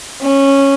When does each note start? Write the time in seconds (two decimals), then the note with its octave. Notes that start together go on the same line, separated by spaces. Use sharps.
0.22 C#4